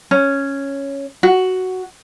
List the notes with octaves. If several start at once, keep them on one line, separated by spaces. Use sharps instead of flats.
C#4
F#4